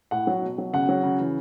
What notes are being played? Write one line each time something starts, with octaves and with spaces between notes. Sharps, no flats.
A2 F#5
F#3
B2
F#3
C#3 F#5
F#3
C#3
E3